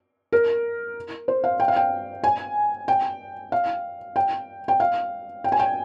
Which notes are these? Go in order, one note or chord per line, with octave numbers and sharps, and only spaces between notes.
A#4
C5
F5
G5
F5
G5
G#5
G5
F5
G5
G5
F5
G5
G#5
G5